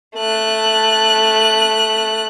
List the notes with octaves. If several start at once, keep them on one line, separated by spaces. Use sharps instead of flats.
A3 F#6